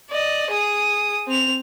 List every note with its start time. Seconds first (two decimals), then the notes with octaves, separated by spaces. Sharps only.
0.10 D5 D#5
0.51 G#4 D#6
1.28 C4 F7